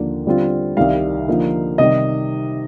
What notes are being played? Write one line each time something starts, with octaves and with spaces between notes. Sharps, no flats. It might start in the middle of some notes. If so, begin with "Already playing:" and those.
Already playing: D#2 D3 F3 A#3 D4
D3 G3 C4 F4
C2 C3 D#3 G3 F5
D3 F3 A#3 D#4
C3 D#3 G3 D#5